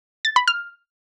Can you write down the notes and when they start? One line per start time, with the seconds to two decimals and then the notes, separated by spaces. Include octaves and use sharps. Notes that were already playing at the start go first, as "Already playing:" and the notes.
0.25 A6
0.36 B5
0.48 F6